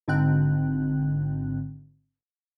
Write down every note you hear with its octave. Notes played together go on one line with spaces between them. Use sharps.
G#1 G#2 D3 C4 G5 F#6